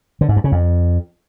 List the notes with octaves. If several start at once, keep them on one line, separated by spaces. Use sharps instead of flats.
D3
G#2
G2
C#3
F2